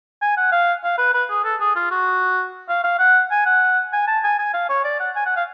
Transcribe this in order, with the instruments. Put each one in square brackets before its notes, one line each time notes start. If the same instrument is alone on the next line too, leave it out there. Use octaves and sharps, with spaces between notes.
[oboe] G#5
F#5
F5
F5
B4
B4
G#4
A4
G#4
F4
F#4
F5
F5
F#5
G#5
F#5
G#5
A5
G#5
G#5
F5
C#5
D5
F#5
G#5
F#5
F5